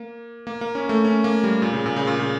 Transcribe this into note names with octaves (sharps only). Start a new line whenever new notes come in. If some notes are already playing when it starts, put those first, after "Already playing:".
Already playing: A#3
A#3
A#3
C#4
A3
C#4
A#3
G3
A#2
C#3
A#2
C#3
A#2
C#3